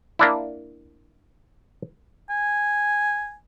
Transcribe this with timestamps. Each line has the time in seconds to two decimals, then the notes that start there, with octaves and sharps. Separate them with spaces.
0.19 A#3 D4 E4
2.30 G#5